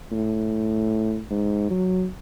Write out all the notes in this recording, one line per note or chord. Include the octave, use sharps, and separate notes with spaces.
A2
G#2
F#3